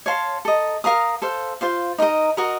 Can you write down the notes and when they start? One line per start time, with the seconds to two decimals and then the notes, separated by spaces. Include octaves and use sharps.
0.06 C#5 F5 A5 C6
0.45 A4 D#5 A#5
0.84 A#4 F5 A#5 D#6
1.22 A4 C5 F5
1.61 F4 C5 F5
1.98 D#4 A#4 D#5 A#5
2.37 F#4 A#4 D#5 A#5